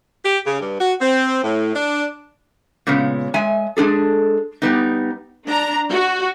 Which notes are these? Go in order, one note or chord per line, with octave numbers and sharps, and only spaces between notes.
G4
C#3
G2
F#4
C4
A2
D4
A#2 C#3 G#3 B3
G#3 E5 G#5
G#3 D4 G#4 A4
G3 B3 D#4
D4 A#5
F#4